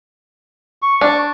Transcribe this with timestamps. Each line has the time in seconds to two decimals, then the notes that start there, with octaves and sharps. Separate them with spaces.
0.82 C#6
1.01 D4